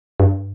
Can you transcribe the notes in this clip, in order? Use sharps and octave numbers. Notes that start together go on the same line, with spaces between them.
G2